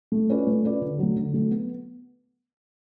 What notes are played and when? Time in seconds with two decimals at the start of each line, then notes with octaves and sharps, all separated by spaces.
0.12 A3
0.30 C#4 F4 B4 D5
0.47 A3
0.64 C#4 F4 B4 D5
0.82 D3
0.99 F#3 A3
1.16 D3
1.33 F#3 A3
1.51 B3